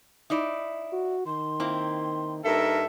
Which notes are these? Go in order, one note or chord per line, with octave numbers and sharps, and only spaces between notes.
D#4 E4 D5
F#4
D#3 C6
A#3 C4 E4
G2 D#4 A4 A#4 E5